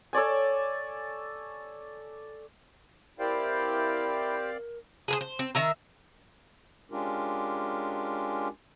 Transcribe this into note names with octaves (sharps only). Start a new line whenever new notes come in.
A4 C#5 D5 G#5
C4 E4 G4 A#4 C5 D5 F5 G5
G#4 B4 C5
C5
C4
D#3 E5 A#5
G#3 C#4 D4 F4 G4 A#4